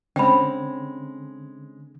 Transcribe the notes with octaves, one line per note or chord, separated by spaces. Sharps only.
D3 G#3 C4 C#4 G5 B5